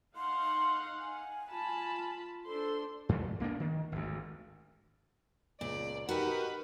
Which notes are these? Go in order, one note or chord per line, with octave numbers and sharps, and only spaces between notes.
D#4 F5 F#5 C6
G#5
F4 A5 B5
D4 A4 C5 C6
G2 A#2 E3 A3
C2 A#3 B3 D4
D#3
G#1 D2
C#2 A#2 D5
D#4 F#4 G4 A#4 B4 F#5